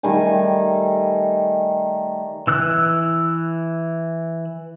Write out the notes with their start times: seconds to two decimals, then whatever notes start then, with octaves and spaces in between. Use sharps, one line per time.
0.03 D#3 G3 A3 G#5
2.47 E3 E6 F#6